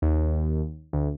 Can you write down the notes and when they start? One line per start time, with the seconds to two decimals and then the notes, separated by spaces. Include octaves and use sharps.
0.02 D#2
0.93 D2